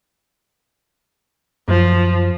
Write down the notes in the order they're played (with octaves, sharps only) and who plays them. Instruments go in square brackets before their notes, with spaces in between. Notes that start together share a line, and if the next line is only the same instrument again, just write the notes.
[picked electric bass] F#2 [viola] F3